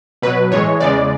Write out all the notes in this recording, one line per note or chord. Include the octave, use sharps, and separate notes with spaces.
B2 F#3 B4
A2 E3 G#3 C#5
E2 C#3 G#3 D5